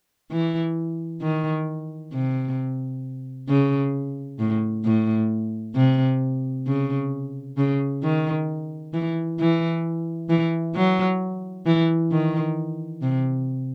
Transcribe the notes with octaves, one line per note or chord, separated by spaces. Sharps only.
E3
D#3
C3
C#3
A2
A2
C3
C#3
C#3
D#3
E3
E3
E3
F#3
E3
D#3
C3